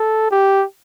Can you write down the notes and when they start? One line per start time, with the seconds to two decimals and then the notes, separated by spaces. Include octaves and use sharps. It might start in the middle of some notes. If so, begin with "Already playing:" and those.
Already playing: A4
0.31 G4